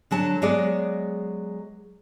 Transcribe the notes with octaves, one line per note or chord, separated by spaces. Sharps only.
D3 F#3 A5
F#3 G#3 B3 G#4 D5